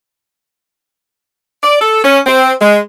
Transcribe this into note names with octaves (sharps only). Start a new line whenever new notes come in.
D5
A4
C#4
C4
G#3